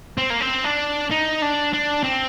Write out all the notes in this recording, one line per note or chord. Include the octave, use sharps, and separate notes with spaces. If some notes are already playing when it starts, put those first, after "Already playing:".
C4
A#3
C4
D4
D#4
D4
D4
C4